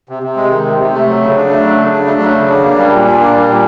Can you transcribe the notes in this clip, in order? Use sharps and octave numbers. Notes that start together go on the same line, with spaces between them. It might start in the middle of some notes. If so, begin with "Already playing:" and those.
C3
C3
G#3
D#3
C3
C3
A3
F#3
C#3
D4
A3
F#3
C#3
D4
A3
F#3
C#3
D4
A#3
G3
A#2
D4
A#3
G3
A#2